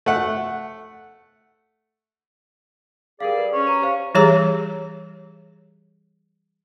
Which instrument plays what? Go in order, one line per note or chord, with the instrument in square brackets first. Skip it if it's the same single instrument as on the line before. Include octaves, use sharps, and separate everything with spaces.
[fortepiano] A3 F#5
[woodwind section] G3 G#4 D5 [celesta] A#4 F5
[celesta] B4
[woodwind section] C#4 [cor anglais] C#5
[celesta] A#5 D#7
G4 C5 F5
[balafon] E3 G3 G4 G#4 C#5 A#5